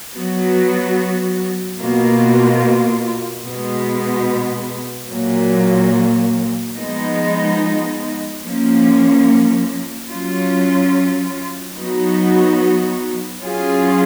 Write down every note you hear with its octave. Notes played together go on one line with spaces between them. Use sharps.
F#3 B3 F#4
B2 A#3 F4
B2 G#3 B3
A#2 F#3 A#3
F3 G#3 B3 D#4
F3 A#3 C#4
F#3 C#4 F4
F#3 B3 D#4 F#4
F#3 C#4 F4 G#4